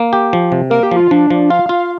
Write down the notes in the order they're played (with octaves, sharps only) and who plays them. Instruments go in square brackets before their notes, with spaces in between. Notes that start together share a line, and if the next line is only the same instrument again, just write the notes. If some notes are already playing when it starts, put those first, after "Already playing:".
Already playing: [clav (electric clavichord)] A#3
G4
F3
C3
[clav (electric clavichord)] A#3 [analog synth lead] A#4
[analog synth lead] G4
[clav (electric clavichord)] F3
[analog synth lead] F4
[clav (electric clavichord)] F3 [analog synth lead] D4
[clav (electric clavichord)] F3
[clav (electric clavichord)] F4 [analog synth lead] F5
[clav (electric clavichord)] F4